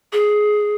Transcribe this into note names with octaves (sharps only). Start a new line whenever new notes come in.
G#4